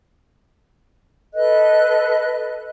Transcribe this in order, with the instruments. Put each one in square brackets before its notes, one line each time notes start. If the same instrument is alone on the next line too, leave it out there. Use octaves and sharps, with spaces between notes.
[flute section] A4 B4 D#5 F#6